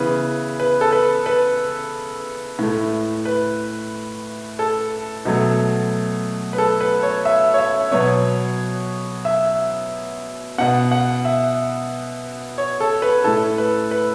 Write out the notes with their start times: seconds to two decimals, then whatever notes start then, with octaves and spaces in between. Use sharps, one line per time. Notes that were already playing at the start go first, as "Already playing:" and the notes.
Already playing: C#3 E3 B3 B4
0.60 B4
0.81 A4
0.92 B4
1.26 B4
2.59 A2 A3
3.25 B4
4.59 A4
5.25 B2 F#3 A3
6.53 B4
6.58 A4
6.81 B4
7.03 C#5
7.25 E5
7.54 C#5
7.59 E5
7.92 B2 F#3 B3 C#5
9.25 E5
10.58 B2 B3 F#5
10.92 F#5
11.25 E5
12.58 C#5
12.80 A4
13.02 B4
13.24 A2 A3 A4
13.58 B4
13.91 B4